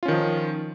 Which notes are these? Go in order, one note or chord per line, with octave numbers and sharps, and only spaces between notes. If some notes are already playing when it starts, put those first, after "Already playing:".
D#3 F3 C#4 F4